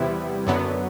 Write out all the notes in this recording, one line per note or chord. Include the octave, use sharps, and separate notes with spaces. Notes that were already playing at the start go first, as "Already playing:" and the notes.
Already playing: E2 C3 G3 B3 E4
F#2 D3 F#3 B3